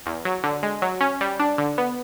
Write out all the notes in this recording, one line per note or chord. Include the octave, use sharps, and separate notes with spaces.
E2
F#3
D3
G#3
F#3
C#4
G3
D4
D3
B3